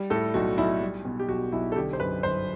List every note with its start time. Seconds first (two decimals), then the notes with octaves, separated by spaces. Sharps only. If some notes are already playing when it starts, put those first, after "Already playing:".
Already playing: G3
0.10 A2 A4
0.34 B1 F#4
0.58 B1 E4
0.81 G3
1.05 B2
1.19 G4
1.28 B1 F#4
1.52 B1 E4
1.72 A4
1.76 D3 G4
1.93 C5
2.00 F#2 B4
2.23 G1 C5